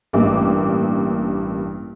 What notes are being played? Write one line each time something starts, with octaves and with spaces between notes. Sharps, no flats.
A1 G2 A#3 D6